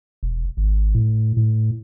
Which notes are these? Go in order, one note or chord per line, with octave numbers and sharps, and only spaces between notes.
E1
G#1
A2
A2